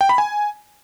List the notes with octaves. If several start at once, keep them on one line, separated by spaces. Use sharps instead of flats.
G5
B5
G#5